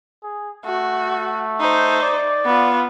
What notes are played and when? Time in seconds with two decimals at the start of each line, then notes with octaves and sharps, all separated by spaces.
0.23 G#4
0.65 A3 F#4
1.60 D#4 C5
2.03 D5
2.46 B3 F4